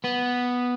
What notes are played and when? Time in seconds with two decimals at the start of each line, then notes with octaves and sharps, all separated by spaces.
0.04 B3